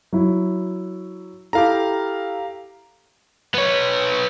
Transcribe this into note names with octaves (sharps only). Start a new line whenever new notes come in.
F#3 E4
E4 G4 A4 F5 A#5
B3 C#5